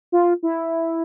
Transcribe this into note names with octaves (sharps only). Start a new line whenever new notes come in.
F4
E4